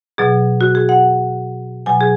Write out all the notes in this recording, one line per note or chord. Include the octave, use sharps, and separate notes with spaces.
B2 F#3 G#4
F#4
G#4
F#5
B2 F#3 G#5
G#4